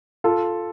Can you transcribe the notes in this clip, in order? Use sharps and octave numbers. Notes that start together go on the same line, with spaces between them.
F4 A4